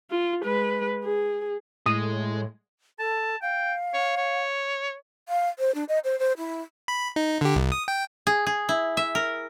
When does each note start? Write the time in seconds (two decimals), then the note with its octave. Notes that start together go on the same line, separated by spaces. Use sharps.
0.10 F4
0.43 G#3 B4
1.04 G#4
1.86 A2 G#3 D#6
2.99 A4 A5
3.42 F5 G5
3.94 C#5
4.17 C#5
5.29 F5
5.59 C5
5.75 D4
5.89 D#5
6.04 C5
6.19 C5
6.38 E4
6.88 B5
7.16 D#4
7.41 D3 G4
7.55 C2
7.72 D#6
7.88 G5
8.27 G#4
8.46 G#4
8.69 E4
8.97 E5
9.15 A#4